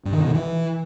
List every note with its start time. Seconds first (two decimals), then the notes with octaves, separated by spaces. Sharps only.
0.05 G2
0.13 D#3
0.20 B2
0.27 D#3
0.34 E3